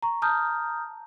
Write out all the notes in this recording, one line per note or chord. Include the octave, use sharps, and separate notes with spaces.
A#5 C#6
A5 A#5 D#6 F6 G6